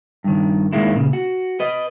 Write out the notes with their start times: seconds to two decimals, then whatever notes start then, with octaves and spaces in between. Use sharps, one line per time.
0.24 G2 D#3
0.73 G#2 D#3 G#3 A#3 E4
0.93 A#2 C#3
1.13 F#4
1.60 B4 D#5